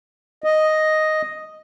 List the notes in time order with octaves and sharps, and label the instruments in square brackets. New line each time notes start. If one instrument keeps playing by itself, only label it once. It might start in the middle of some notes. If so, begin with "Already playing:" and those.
[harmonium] D#5